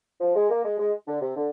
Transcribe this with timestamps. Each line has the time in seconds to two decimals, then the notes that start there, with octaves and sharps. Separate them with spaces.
0.21 F3
0.36 G#3
0.50 A#3
0.65 G#3
0.79 G#3
1.08 D3
1.22 C3
1.37 D3